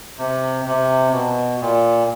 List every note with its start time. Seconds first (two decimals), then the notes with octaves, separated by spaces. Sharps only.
0.18 C3
0.66 C3
1.13 B2
1.61 A#2